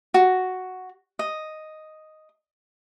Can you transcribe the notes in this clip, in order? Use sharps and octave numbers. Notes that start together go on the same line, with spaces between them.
F#4
D#5